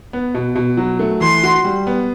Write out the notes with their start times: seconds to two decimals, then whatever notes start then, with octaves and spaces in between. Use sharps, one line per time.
0.13 B3
0.35 B2
0.56 B2
0.77 F#3
0.99 A3
1.21 E3 C6
1.43 F#4
1.64 G3
1.87 B3